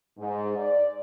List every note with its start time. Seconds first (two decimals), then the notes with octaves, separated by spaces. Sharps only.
0.19 G#2
0.56 D5